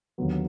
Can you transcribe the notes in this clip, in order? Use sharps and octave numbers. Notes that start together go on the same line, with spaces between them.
D#2 D3 F#3 B3